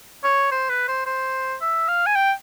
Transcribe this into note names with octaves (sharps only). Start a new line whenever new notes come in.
C#5
C5
B4
C5
C5
E5
F5
G#5
G5